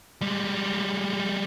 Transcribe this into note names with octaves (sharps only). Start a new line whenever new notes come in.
G3 G#3